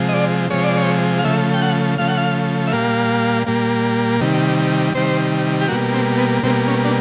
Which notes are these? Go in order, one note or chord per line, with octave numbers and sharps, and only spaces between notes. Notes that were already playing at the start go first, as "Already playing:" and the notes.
Already playing: C3 F3 G#3
D#5
D5
C3 F3 G#3 C#5
D5
C#5
F5
C#3 F3 A3 E5
G5
F#5
C#3 F3 A3 F5
F#5
F5
E5
A#2 G3 A#3 F5
A#2 G3 A#3
C3 D#3 G3
C3 D#3 G3 C5
G4
B2 G3 A#3 F#4
C4
B3
B2 G3 A#3 C4
C#4
D4